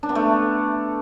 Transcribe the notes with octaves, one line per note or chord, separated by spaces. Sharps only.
D4
B3
A3